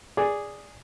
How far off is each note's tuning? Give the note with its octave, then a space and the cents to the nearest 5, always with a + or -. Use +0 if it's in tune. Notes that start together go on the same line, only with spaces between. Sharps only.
G#4 -10 D5 -5